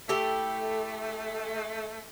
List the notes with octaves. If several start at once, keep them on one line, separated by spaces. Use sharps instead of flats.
A3 E4 G4 A4